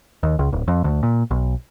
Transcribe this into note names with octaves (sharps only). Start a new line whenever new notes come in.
D#2
C#2
D1
F2
D2
A#2
B1